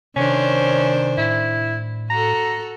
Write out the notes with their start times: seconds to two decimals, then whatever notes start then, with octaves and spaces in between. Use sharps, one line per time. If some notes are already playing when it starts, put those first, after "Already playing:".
0.16 C3 D#3 C#4 D4 C5
1.18 A2 E4
2.10 F#4 A4 A#5